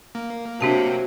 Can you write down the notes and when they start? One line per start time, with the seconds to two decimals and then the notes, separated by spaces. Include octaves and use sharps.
0.15 A#3
0.61 C3 F#3 D4 G4 A5